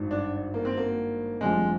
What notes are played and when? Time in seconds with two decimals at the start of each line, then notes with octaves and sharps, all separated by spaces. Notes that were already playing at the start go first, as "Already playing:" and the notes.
Already playing: G#1 G2 D#3
0.11 D4
0.54 A#3
0.65 C4
0.77 A#3
1.41 F1 F2 D3 G3 G#3 C4